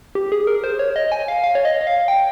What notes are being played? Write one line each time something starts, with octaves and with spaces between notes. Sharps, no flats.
G4
G#4
A#4
C5
C#5
D#5
G#5
F5
F5
C#5
D#5
D#5
F5
G5